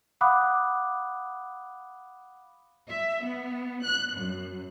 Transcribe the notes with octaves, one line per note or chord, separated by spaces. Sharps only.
F5 F#5 B5 D6 D#6 F#6
E5
B3
F#6
F#2